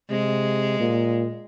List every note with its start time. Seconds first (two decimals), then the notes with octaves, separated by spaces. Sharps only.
0.11 C3 G#3
0.80 A#2